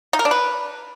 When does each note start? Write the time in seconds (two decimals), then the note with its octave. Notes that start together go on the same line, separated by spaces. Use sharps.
0.13 D#4
0.19 A#4
0.25 D4
0.31 B4